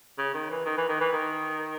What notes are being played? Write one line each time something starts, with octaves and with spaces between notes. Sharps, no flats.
C#3
D#3
E3
D#3
E3
D#3
E3
D#3